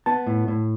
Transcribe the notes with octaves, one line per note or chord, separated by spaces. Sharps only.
B3 A5
A2
A2